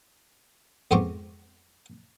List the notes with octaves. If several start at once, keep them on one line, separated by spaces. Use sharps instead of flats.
F2 G#2 B3 C4 C#6 D6